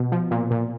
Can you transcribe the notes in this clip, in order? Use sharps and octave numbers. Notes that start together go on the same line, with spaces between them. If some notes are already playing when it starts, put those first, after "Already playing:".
Already playing: B2
F3
A#2
A#2